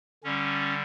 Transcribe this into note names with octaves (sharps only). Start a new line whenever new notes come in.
D3 G3 C#4